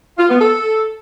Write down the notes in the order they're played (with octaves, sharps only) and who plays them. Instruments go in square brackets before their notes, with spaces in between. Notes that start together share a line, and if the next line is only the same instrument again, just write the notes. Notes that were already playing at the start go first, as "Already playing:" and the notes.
[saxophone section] F4
B3
A4